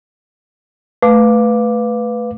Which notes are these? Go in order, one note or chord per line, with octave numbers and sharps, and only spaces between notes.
A3 B4 F5 D6